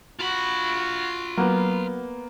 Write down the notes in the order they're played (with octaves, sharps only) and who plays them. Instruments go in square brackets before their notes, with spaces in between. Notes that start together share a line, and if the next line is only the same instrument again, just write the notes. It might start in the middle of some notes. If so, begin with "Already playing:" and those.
[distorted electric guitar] F4 B5 [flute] F#4
[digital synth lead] F#3 [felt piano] A#3 B3